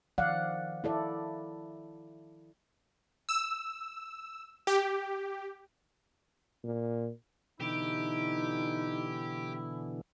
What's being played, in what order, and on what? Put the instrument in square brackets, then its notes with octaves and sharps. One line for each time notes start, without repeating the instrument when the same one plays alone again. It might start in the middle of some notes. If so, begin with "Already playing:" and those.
[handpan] D#3 F3 D5 F5 F#5
E4 A4 D5
[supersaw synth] E6
G4
[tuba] A#2
[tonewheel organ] B2 D3 E3 [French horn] D#4 [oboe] E4 [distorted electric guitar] G4